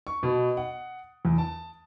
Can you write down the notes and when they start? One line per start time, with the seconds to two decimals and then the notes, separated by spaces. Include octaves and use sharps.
0.07 C#6
0.23 B2
0.57 F#5
1.25 E2
1.38 A5